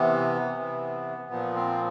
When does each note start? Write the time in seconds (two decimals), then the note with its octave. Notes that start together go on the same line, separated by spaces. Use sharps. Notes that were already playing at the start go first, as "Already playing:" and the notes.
Already playing: C3 E3 B3
0.53 C3 E3
1.29 A#2 F3 B3
1.54 C4